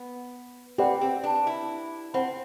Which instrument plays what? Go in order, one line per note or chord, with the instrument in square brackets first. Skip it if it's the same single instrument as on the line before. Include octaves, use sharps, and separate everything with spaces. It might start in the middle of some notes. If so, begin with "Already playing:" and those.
Already playing: [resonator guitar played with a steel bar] B3
[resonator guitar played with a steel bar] C4 [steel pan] G4 B4 D5 F#5
[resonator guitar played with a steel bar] C4
D4
E4
[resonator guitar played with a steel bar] C4 [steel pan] C5 F#5 B5